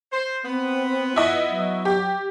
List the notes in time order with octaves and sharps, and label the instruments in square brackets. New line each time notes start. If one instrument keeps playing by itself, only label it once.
[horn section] C5
[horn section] B3 [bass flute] C4
[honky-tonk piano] E4 D#5 [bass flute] F4
[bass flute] F#3
[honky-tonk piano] G4